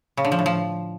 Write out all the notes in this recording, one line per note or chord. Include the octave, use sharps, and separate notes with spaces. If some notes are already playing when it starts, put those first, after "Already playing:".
C#3
D3
F3
A2
F3